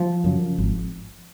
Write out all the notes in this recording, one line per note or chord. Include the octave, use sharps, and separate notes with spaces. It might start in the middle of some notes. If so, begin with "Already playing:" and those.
Already playing: F3
F#2 C#3
G#1